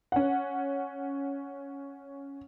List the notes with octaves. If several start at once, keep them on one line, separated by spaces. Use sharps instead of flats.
C#4 F#5